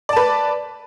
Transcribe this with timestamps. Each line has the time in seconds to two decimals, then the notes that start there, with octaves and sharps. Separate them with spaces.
0.09 D5
0.13 A5
0.16 B4